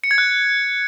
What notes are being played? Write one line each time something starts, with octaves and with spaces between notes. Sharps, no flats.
C#7
G#6
F#6